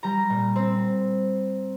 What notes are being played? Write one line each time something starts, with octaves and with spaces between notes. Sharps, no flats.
G3 A#5
A#2
C4